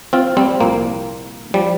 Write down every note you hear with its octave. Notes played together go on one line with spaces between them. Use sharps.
C4 F4
G3 C4
C2 A#2 F3 A#3
F3 G3